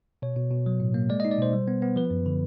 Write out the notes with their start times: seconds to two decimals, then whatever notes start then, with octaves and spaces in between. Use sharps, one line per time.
0.22 B2 C#5
0.36 B2
0.51 B2
0.66 F#3
0.80 A2
0.94 A#3
1.09 G#3 D5
1.20 D#4 D#5
1.31 D5
1.39 B2 C5
1.53 G3
1.68 B3
1.82 B3
1.96 F3 B4
2.11 F#2
2.26 D3